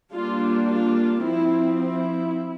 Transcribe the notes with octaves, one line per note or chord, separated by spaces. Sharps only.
G3 A#3 D4 F4
F4
F3 C4 E4
E4